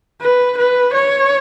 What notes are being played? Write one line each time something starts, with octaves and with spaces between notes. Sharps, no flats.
B4
B4
C#5